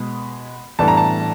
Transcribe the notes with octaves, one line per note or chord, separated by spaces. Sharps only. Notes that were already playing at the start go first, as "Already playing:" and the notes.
Already playing: B2 G#3 B3 B5
A2 E3 G3 B3 D4 A5
A#5
A5